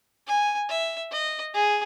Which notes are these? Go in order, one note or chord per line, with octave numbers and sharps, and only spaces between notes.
G#5
E5
D#5
G#4